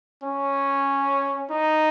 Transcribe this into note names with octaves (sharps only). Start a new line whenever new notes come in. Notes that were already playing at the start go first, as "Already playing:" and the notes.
C#4
D#4